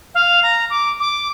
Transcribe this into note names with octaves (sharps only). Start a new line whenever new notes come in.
F5
A#5
D6
D6